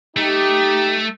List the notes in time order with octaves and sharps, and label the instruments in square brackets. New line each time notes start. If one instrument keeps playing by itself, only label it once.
[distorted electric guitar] A3 [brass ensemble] D#4 G4